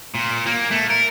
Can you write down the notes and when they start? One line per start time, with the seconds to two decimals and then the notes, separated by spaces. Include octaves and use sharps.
0.15 A#2
0.46 A#3
0.71 A3
0.90 A#4